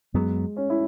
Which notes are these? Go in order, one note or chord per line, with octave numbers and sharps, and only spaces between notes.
F#2 F#3 G#3 B3
C#4
E4